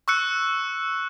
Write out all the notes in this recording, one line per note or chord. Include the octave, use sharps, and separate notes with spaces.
C#6 E6 F#6 C#7